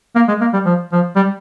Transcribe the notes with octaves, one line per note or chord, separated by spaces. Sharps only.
A#3
G#3
A#3
G3
F3
F3
G3